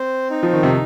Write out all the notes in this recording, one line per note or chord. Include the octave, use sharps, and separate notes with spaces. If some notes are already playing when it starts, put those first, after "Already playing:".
Already playing: C4 C5
D#4
F3
D#3
C3